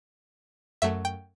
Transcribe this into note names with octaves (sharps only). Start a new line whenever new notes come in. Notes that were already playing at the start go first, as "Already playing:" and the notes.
F#2 F#3 A3 E5
G5